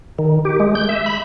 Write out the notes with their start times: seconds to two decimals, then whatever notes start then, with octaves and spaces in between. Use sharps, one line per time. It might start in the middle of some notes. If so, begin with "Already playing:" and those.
0.19 D#3
0.45 G4
0.60 G#3
0.75 G6
0.89 E5
1.06 B5